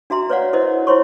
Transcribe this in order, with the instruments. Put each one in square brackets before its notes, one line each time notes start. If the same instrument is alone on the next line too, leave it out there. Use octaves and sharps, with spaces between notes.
[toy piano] D4 F#4 E5 A#5 C6
B4 C#5 D5 F5 F#5
E4 A#4 C5 D#5
E4 F4 C5 C#5 C6 C#6